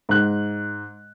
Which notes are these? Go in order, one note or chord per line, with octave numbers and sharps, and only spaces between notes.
G#2 F#6